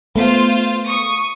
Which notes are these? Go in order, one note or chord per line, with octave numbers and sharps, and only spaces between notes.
A3 B3 F4 C5 F5
C#6 D#6